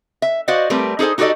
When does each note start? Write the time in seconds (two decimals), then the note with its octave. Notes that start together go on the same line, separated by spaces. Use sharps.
0.22 E5
0.48 F#4 C5 D5 D#5 F5 F#5
0.70 G3 A3 C4 A#4 B4
0.99 D#4 G#4 A4 C5 G#5
1.18 D#4 F#4 G4 A4 D5 D#5